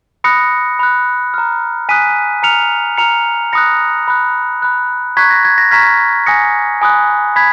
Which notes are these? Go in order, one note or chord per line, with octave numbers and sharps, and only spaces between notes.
B5 D#6 F#6 A#6 C#7
B5 F#6
A#5 F6
G#5 D#6 F#6 B6 D#7
A#5 F6 C#7 F7
A#5 F6 C#7 F7
B5 D#6 F#6 A#6 C#7
B5 F#6
B5 F#6
A#5 C#6 F#6 G#6 B6
A#6
G#6
A#6
A#5 C#6 F6 G#6 B6
G#5 D#6 F#6 A#6 C#7
G#5 B5 D#6 F#6
B5 G#6 B6